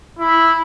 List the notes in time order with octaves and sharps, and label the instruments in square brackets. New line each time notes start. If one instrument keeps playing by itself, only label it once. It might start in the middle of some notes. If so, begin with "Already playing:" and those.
[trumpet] E4